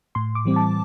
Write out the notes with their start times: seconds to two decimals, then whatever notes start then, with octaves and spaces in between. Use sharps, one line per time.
0.15 A2 C6
0.35 D6
0.45 E3 G3 C4
0.56 A5